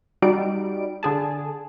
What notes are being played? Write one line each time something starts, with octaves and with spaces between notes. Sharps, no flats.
G3 D#4 F#4 D7
D3 G#4 A5